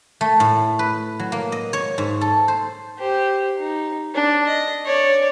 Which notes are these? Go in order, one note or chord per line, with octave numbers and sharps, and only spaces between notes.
A3
A2
B4
F#3
A#3
D#5
C#5
G#2
A4
C5
G4 C5
D#4
D4
D#5
C#5 D5